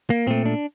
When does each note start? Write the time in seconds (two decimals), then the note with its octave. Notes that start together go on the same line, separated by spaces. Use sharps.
0.10 A#3
0.27 A#2 A3 C4
0.46 D4